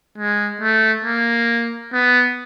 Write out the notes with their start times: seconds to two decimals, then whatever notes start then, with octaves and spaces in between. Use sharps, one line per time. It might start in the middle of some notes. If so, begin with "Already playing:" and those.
0.18 G#3
0.61 A3
1.05 A#3
1.93 B3